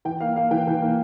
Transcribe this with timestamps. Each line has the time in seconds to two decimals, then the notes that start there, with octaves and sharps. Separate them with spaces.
0.05 E3 G5
0.21 A#3 F5
0.36 A#3 F5
0.51 E3 G5
0.67 E3
0.82 A#3